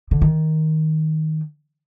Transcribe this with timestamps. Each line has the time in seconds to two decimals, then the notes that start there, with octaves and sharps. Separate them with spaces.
0.11 D3
0.21 D#3